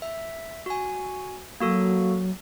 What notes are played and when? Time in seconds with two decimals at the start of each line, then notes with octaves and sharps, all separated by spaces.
0.02 E5
0.66 F#4 G#5
1.60 F#3 A#3 F#4 A4